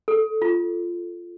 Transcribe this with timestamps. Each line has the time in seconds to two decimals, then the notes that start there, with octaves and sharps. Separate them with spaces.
0.08 A4
0.42 F4